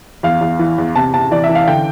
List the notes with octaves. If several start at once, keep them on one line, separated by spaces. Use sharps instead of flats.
E2 F5
E2
E3
E2
C3 A5
C3 A5
E3 D5
E5
E3
F5
D3 G5